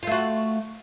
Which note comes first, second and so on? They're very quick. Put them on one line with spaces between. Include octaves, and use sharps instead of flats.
F4 A3 F#4